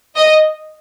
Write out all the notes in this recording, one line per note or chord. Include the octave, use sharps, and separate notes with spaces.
D#5